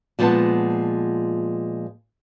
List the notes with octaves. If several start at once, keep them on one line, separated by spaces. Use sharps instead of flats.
A#2 F3 G#3 B3 F#5 A5